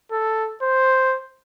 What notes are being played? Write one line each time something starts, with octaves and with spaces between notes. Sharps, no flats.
A4
C5